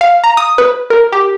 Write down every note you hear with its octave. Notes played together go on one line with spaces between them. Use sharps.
F5
A#5
D#6
B4
A#4
G4